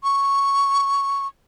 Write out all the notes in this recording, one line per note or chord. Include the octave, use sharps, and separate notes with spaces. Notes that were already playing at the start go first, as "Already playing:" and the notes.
C#6